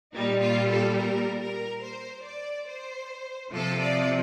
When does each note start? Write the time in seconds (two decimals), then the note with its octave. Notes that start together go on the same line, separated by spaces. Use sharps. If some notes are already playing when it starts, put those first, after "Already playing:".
0.13 A#2 G3 D#4
0.41 F4
0.69 A4
0.96 A#4
1.40 A#4
1.82 C5
2.24 D5
2.67 C5
3.51 C3 F3 A4
3.79 D5